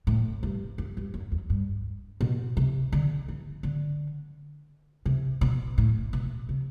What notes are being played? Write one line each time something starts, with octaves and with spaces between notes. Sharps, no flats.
A2
G2
F#2
G2
F#2
E2
G2
B2
C3
D3
E3
D3
C3
B2
A2
B2
C3